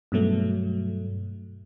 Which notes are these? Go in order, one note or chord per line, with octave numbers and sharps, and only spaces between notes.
G2 B2 F#3 A3